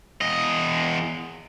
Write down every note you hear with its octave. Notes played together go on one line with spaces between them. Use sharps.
E2 D#5